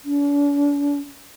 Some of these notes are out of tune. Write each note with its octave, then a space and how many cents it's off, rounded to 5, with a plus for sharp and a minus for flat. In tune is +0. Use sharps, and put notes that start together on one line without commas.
D4 -45